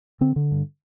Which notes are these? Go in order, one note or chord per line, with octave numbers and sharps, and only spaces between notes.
D3 C4
D3
G2